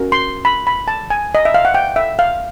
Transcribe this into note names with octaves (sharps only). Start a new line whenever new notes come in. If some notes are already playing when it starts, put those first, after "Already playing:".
Already playing: C#4 F#4 A#4
C6
B5
B5
A5
G#5
D#5
E5
F5
F#5
G5
E5
F5